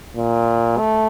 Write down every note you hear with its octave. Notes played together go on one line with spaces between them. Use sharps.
A#2
A3